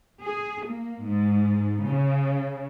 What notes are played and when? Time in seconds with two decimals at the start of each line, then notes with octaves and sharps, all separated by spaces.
0.23 G#4
0.66 A#3
1.05 G#2
1.86 C#3